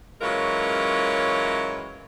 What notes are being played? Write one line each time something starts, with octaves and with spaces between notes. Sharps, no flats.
E3 F#3 G#3 C#4 F4 A#4